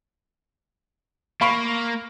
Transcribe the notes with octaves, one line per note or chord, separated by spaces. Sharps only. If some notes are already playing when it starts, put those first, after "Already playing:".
A#3 F5 B5 C#6